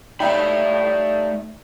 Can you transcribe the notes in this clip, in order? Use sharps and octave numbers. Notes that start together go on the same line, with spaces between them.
G3 A3 D#4 E5 F5 G5 B5